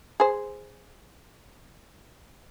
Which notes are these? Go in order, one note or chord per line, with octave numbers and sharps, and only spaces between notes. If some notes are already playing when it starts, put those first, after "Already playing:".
G#4 C5